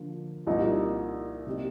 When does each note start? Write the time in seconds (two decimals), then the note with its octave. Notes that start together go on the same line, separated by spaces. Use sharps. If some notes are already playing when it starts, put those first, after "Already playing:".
Already playing: D3 F3 A#3 F4
0.46 C2 A#2 G3 A#3 D#4
1.46 C3 G3 A#3 D#4 G4